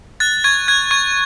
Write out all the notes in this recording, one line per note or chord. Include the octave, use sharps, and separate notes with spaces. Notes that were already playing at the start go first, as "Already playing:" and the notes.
F#6 A6
C#6 G#6
F#6 G#6
C#6 G#6